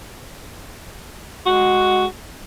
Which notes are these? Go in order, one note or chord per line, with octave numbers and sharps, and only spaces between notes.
G#3 F#4